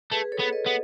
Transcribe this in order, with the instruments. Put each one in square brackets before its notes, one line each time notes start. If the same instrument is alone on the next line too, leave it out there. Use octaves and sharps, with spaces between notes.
[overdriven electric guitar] A3 [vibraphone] G#4 B4
[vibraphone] A4 C#5
[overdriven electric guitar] B3
[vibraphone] B4 D#5
[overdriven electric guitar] B3